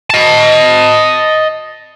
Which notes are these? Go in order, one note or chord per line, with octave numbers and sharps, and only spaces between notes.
D#5 A5